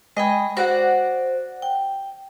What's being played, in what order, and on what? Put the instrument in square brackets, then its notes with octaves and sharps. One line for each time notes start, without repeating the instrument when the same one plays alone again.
[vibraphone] G#3 G5 B5 [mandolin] D#5 G#5
[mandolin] F#4 D5 F#5 [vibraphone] C5
[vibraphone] G5